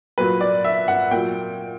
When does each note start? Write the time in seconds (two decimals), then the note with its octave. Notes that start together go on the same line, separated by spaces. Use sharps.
0.18 A#2 F#3 B4
0.41 D5
0.64 E5
0.88 F#5
1.11 A#2 F#3 G5